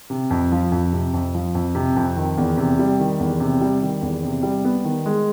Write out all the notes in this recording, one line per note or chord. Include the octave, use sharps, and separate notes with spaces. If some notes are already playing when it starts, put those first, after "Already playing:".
C3
F2
F3
F2
C3
F2
F3
F2
C3
F2
D#3
E2
C3
G3
D#3
E2
C3
G3
D#3
E2
C3
G3
B3
D#3
G#3